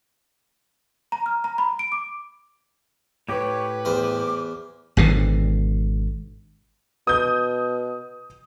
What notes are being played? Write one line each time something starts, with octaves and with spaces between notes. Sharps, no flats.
A#5
F6
A#5
B5
D7
D6
A2 G4 B4 C#5
E2 C5 D6
G#1 B2 D3
B2 D#6 G6